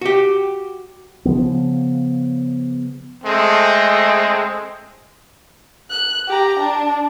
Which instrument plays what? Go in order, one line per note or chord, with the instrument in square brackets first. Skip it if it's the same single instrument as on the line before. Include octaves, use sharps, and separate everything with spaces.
[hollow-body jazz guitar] F#4 G4
[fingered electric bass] C#3 F3 B3
[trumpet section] G#3 A3 C4
[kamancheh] F#6
G4 A#5
D4